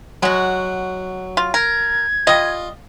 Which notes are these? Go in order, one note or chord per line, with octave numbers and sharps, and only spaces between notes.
F#3 G#3 F#4
F4
A#4 G#6
G3 F4 D#5